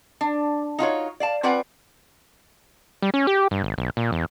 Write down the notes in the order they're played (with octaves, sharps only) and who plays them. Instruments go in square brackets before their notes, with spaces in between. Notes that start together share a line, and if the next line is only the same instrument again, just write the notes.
[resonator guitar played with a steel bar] D4
D#4 F4 F#4 C#5
D5 F5 A5
C4 F4 B4 D5 F#5 G#5
[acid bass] G3
C#4
G4
G2
G#1
B1
A#2
E2